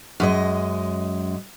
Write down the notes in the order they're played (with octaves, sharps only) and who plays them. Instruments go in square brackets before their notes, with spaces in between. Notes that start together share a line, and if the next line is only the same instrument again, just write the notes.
[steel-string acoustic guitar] F#2 G#3 D#5